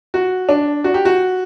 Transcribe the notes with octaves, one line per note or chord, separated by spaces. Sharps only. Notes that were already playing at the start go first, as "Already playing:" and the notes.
F#4
D4
F#4
G4
F#4